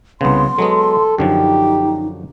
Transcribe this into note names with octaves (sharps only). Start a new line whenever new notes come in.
C2 C#3 B3 C6
F#3 G#3 B3 A4
F#2 D3 F3 D#4 G4